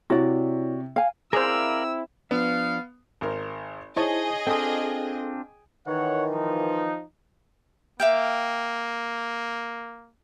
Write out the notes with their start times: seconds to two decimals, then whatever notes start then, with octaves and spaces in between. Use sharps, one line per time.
0.10 C3 E4 F#4 C#5 D5
0.96 F5 G#5
1.33 C4 E4 G#4 A#4 C5 D5 F5 E6
2.31 F3 B3 D4 F5
3.21 G#1 A#4 C5
3.96 D#4 E4 G#4 C5 C#5 D#5 A5 C#6
4.47 C4 D4 F4 A4 G5 G#5 D#6
5.87 D#3 E3 C#5 F#5
6.31 F3 D#4
8.00 A#3 E5 F5 G5